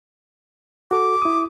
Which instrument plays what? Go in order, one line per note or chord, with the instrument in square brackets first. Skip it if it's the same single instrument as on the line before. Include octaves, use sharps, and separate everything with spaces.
[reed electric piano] F#4 A4 [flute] D6
[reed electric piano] E4 D#6